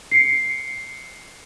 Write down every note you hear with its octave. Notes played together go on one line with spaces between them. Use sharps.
C7 C#7